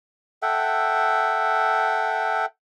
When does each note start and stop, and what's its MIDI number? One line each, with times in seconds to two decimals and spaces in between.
0.42 2.46 69
0.42 2.46 76
0.42 2.46 78
0.42 2.46 79